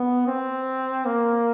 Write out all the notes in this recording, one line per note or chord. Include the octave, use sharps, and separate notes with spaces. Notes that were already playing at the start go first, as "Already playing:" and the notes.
Already playing: B3
C4
A#3